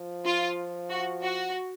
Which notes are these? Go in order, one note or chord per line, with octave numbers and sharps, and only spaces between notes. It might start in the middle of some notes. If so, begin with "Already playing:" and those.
Already playing: F3
F4
F#4
F#4